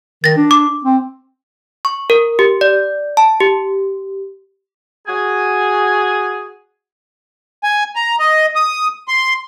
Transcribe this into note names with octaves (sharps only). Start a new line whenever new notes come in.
D#3 A6 A#6
D4
D6
C4
C#6
A#4
G4
D5
A5
G4
F#4 G#4 G#5
G#5
A#5
D#5
D#6
C6